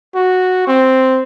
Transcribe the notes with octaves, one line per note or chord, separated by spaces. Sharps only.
F#4
C4